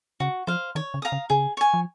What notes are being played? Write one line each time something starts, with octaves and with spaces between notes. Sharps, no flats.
C#3 F#4
F3 C5 F5
D#3 C#5
C#3
F5 A#5 D#6
C#3
C#3 G#4
C#5 G#5
F3